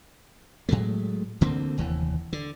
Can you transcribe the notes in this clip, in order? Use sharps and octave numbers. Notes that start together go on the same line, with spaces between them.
A2 F#3 G#3 A3
D2 D3 A#3 C4
F1 D#2 E3
D3